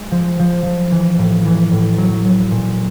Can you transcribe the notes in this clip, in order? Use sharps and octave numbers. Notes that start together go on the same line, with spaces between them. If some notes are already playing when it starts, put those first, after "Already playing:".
Already playing: G#3
F3
F3
F3
E3
A2
E3
A2
F#3
F#3
A#2